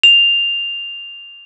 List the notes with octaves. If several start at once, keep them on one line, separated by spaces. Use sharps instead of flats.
F7